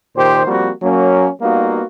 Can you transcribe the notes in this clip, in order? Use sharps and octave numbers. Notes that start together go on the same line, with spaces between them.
A#2 D#3 G4 C5
F3 G3 A#3 C4 F#4
F#3 A#3 C#4
G3 A#3 B3 D#4 F4 F#4